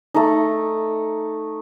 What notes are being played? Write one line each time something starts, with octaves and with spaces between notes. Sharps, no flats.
A3 D#4